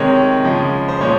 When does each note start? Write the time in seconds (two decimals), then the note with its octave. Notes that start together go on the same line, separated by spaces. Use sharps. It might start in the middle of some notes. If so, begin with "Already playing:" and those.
Already playing: C3 D#3 G#3 C#5
0.44 C#3 F3 G#3
0.88 C5
1.01 A#2 F3 G#3 C#5